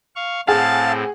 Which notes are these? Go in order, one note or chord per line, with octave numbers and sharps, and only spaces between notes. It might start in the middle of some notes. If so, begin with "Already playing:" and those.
F5 C#6
A2 C4 G#4 F5 F#5 A5